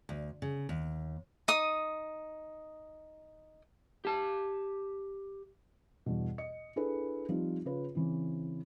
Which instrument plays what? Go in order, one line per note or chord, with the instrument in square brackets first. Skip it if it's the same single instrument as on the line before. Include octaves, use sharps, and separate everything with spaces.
[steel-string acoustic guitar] D2
C#3
D#2
[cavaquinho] D#4 D#6
[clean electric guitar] G4 A5
[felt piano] E2 G2 B2
D#5 C#7
D4 E4 G#4 A4 B4
F3 G3 C4 D#4 F4
C#3 F4 B4
C#3 E3 C4